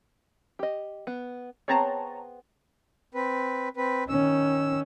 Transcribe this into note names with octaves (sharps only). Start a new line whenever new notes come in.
G4 D#5
B3
B3 C4 G#4 C#5 A5 A#5
C4 B4
C4 B4
D#3 C#4 E6